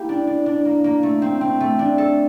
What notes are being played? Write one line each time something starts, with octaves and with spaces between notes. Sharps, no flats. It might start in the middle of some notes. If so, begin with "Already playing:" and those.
Already playing: A#3 E4 G4
D4
D4
D4
A#3
A#3
A3
C4
C4
A3
D4
A4